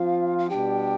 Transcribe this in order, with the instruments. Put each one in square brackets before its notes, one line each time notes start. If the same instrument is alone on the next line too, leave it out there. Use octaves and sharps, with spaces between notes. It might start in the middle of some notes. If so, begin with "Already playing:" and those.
Already playing: [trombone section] F3 C4 F4 [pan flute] F5
[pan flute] F5
[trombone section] B2 G3 D4 G4 [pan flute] G5